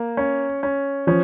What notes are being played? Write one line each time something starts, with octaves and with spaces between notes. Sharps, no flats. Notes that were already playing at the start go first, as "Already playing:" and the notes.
Already playing: A#3
C#4
C#4
F3 C#4